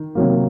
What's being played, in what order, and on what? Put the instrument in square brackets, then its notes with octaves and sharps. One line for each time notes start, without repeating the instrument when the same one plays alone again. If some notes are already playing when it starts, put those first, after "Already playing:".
Already playing: [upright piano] D#3
C3 D#3 F#3 A#3